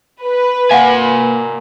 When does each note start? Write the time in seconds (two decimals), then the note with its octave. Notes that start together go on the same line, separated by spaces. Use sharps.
0.24 B4
0.71 A#3 F5 F#5 G#5